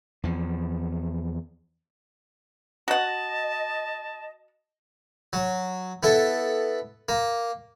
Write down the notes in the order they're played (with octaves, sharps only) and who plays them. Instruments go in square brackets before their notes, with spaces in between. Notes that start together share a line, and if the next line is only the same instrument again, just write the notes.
[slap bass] E2 F3
[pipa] F#4 F#5 [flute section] D#5 [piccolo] A5
[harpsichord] F#3
B3 E4 A4
A#3